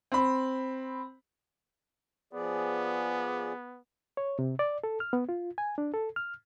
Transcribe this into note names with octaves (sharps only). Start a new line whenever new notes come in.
C4 B5
F3 B3 G#4 D5
C#5
C3
D5
A4
F6
B3
F4
G#5
D4
A4
F6